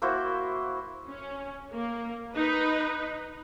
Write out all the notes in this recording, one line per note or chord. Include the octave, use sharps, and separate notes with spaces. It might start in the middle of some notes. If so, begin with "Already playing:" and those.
A#3 E4 F#4 C5
C#4
A#3
D#4 B4